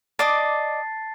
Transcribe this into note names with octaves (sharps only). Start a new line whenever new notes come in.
D5 D#5 A5 D6 A6 C7